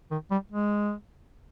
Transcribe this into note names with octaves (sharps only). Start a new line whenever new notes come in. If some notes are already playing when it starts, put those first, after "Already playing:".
D#3
G3
G#3